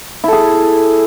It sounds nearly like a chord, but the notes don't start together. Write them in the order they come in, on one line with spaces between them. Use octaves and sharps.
E4 A4 G#4